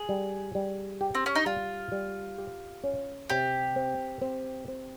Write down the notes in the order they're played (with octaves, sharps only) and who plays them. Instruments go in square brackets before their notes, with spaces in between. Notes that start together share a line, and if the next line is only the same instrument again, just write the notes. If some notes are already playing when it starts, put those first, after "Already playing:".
Already playing: [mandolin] G#4
[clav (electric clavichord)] G3
G3
G4
[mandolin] C4
C#4
D#4
[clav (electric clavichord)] G3 [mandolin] F4
[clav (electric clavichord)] G3
G4
C#4
[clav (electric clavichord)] C3 [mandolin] G4
[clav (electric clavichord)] C4
C4
C4